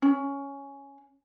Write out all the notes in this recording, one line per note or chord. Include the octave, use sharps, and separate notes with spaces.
C#4